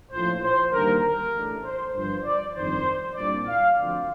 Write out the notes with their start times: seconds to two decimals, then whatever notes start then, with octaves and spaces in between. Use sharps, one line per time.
0.12 A#1 A2 F3 C5
0.42 C5
0.72 D#2 D3 G3 A#3 A#4
1.03 A#4
1.33 A1 A2 A3 D4
1.63 C5
1.94 G1 G2 F3 C5
2.24 D5
2.54 G1 F2 D#3 C5
3.15 C2 A#2 G3 A#3 D4 D5
3.46 F5
3.76 D2 D3 F3 C4 D5